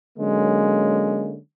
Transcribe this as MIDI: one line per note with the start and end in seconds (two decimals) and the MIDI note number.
0.18 1.38 50
0.18 1.38 54
0.18 1.38 56
0.18 1.38 58
0.18 1.38 61